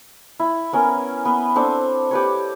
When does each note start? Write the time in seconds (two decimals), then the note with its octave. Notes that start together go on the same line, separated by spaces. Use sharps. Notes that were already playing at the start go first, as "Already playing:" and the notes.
0.40 E4
0.73 B3 C#4 A#4
1.25 B3
1.56 C4 D4 A4
2.11 G4 B4 C#5